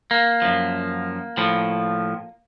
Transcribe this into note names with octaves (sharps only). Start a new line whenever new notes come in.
A#3
F#2 F3
A2 F3